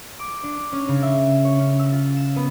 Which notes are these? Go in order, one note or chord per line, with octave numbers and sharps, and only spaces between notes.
D6
D4
C#4
C#3
E5
E7
C#5
C#4
E6
F4
E7
B3